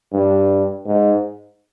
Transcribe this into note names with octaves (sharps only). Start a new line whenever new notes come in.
G2
G#2